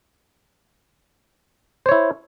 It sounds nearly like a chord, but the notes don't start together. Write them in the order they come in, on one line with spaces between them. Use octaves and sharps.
C5 C#5 E4